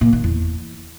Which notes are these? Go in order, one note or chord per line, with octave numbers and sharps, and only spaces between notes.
A#2
D#3
E2